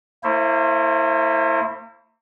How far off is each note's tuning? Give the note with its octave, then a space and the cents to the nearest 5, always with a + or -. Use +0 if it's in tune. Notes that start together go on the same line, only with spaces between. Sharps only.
A#3 -40 E4 -5 C5 +30